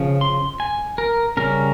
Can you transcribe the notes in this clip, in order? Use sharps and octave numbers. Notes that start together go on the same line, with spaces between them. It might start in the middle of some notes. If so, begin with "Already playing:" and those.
Already playing: C#3 F3
C6
G#5
A#4
C#3 G3 C#4 A#4